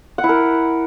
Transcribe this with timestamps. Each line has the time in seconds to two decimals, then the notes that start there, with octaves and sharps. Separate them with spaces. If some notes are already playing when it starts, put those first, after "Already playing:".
0.18 F#5
0.24 E4
0.29 A#4